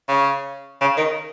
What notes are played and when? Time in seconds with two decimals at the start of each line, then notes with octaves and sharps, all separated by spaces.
0.08 C#3
0.81 C#3
0.97 D#3